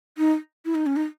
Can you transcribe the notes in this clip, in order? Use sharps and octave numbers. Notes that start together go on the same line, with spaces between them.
D#4
E4
D#4
C#4
D#4